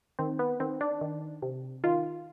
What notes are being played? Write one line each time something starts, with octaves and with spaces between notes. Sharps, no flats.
D#3 C4
B3
D#3 C4
D4
D#3
C3
D#3 F4